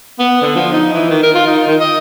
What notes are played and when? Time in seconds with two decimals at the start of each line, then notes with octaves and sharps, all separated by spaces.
0.19 B3
0.42 D3
0.56 F3
0.73 D#4
0.93 E3
1.10 D#3
1.23 A#4
1.35 F4
1.47 D#4
1.67 D#3
1.80 D#5